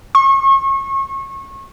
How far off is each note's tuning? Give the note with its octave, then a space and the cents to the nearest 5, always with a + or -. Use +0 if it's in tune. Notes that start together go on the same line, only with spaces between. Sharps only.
C#6 -35